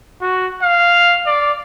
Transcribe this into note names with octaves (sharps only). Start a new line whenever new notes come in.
F#4
F5
D5